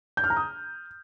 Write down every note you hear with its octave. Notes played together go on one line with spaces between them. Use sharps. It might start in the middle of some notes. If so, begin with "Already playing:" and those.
G6
F6
A#5
D#6